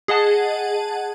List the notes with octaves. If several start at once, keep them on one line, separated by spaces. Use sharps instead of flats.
G#4 D#5 F#5 A5